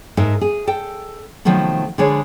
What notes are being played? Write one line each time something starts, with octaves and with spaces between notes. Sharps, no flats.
G#2 D#4 A4 A#4 E5
G#4
A4 G5
C3 D#3 F3 F#3 A3 B3
D3 F3 G#3 G#4 B4 C#5